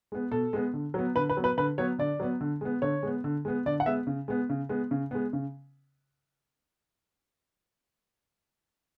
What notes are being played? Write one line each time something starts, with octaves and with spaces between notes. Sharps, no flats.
G#3 B3
B2 A4
G#3 B3
D3
F#3 B3
D3 B4
B4
F#3 B3
B4
D3 B4
F#3 B3 C#5
D3 D5
F#3 B3
D3
G#3 B3
D3 C#5
G#3 B3
D3
G#3 B3
D3 D5
F#5
G#3 B3 E5
C#3
G#3 B3
C#3
G#3 B3
C#3
G#3 B3
C#3